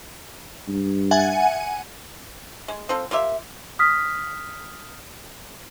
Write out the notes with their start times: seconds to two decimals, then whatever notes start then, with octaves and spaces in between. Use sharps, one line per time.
0.68 G2
1.11 E5 F#5 G#5
2.68 G#3
2.89 C4 F4 A4
3.11 A#3 F4 G4 E5
3.79 D#6 F6 B6